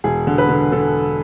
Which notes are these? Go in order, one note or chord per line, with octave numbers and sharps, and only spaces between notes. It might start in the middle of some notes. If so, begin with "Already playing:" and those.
E1 G#4
D3
B4
D3
D3 A4